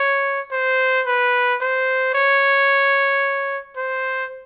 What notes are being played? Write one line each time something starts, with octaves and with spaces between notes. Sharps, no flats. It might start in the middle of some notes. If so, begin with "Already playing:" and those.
Already playing: C#5
C5
B4
C5
C#5
C5